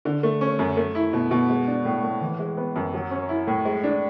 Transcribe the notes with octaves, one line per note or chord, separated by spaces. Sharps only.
D3
A3
C#4
F#2
A3
E4
B2
B2
G#3
D4
A2
A2
E3
G#3
B3
F#2
F#3
C#4
E4
A2
G#3
D4